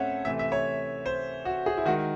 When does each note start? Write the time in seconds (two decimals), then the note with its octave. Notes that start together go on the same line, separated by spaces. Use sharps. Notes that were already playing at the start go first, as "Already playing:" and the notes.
Already playing: A2 C4 C#4 A4 C#5 E5 F#5
0.25 C3 E3 A3 E5
0.39 E5
0.52 C#5
1.06 C5
1.45 F#4
1.66 G#4
1.78 E4
1.86 D#3 G#3 F#4